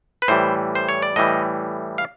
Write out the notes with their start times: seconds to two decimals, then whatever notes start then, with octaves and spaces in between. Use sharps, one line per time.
0.22 B4
0.28 A2 E3 G3 C5
0.75 C5
0.89 C#5
1.02 D5
1.16 A2 E3 G3 D#5
1.98 F5